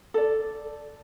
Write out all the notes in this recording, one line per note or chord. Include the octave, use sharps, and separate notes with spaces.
A4 D5